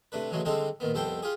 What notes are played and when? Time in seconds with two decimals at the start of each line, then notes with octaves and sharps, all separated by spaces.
0.12 C3 A3 D4 B4
0.31 C#3 E3 F#3 G#3 A3
0.45 D3 G3 G#3 C4 D#4 A4
0.80 A#2 D#3 B3
0.94 C2 F2 B3 A4 C5 G5
1.23 F4 G4 G#4